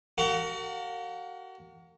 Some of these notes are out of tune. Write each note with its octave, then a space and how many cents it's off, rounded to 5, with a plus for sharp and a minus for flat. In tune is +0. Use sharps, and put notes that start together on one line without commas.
F#4 +30 A#4 -40 F5 +40